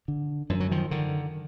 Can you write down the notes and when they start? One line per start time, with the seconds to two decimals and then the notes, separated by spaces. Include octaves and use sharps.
0.08 D3
0.50 F#2 F3
0.60 F#3
0.71 D#3 F3
0.91 D3 D#3